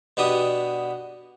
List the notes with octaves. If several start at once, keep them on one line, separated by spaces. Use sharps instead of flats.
B2 B3 D4 G4 D#6